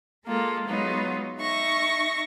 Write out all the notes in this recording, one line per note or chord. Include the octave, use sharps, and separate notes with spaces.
G#3 A#3 F4 A4
F#3 G#3 B3 D#4 F4
D#4 E5 C#6 A#6